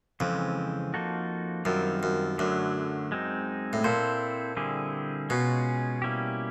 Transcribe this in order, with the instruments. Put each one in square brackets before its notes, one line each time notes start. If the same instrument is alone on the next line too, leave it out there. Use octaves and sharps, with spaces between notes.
[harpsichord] F2 [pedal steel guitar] C#3 E3 G#3 C4
[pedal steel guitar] F3 A#3 D#4 F#4 A4
[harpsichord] F#2 [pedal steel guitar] D#3 G3 C4 F4 A#4
[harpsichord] F#2
[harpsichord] F#2 [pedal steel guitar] D3 F#3 A3 D4
[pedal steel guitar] G#3 C4 D#4
[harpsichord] A2
[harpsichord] A#2 [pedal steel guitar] C4 E4 A4 C5
[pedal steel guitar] D3 G3 C4 E4 G#4
[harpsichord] B2 [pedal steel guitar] G#3 C#4 F4
[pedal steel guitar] G3 A#3 C#4 E4 G4